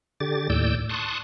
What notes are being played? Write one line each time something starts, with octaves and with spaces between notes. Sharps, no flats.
D3 G4 A6
D#2 A2 D5 E6 G6
A5 C6 C#6 D#6 F#6